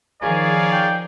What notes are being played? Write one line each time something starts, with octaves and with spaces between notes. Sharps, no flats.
D#3 F3 G#4 A#4 C#5 D5 F5 G#5
G5